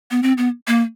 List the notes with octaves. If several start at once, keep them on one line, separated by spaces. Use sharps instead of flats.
B3
C4
B3
A#3